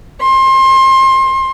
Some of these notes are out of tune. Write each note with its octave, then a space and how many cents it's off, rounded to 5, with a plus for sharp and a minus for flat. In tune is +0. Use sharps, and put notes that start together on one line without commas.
C6 +30